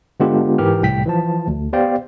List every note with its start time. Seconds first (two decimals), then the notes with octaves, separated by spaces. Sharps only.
0.20 D3 G#3 B3 D4 F4 G4
0.58 G#2 E3 G4 A#4 F6
0.82 C2 A2 G5 B6
1.06 E3 F3 A5
1.48 D2
1.73 B3 G4 C5 D5 F5 G5